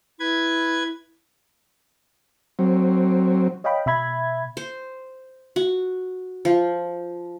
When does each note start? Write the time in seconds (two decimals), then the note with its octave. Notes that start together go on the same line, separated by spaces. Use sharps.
0.20 E4 B4 G#6
2.59 F#3 C4
3.64 C#5 D#5 F5 G5 B5
3.86 B2 E5 B5 G#6
4.57 C5
5.56 F#4
6.45 F3